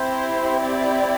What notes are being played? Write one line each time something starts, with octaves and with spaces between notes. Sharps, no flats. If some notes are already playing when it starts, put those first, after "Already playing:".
Already playing: C4 E4 G4 C5
D5